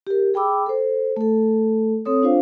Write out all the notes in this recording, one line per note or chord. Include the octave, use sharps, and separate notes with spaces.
G4 A#4
G#4 G5 B5 D6 E6
A4 C5
A3 A4
C4 A4 C#5 D#6
D4 F4 C5 F5